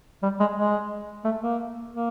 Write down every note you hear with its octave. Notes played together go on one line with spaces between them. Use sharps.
G3
G#3
G#3
A3
A#3
A#3